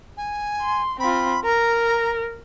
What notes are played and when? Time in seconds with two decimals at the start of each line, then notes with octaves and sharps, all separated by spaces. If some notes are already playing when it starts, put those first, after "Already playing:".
0.17 G#5
0.61 C6
1.00 C4 F4 B5
1.44 A#4 A#5